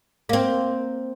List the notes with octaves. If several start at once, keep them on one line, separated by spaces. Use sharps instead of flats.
A#3 C4